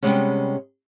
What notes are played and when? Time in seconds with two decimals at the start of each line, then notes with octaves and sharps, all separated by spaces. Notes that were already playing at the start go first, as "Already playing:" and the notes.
0.03 C3 F3 G3 G#3 B3 C#4